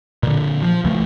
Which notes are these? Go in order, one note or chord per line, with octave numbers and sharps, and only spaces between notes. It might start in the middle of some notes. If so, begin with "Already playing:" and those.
A#2 D3
F3
C#2 E3 A3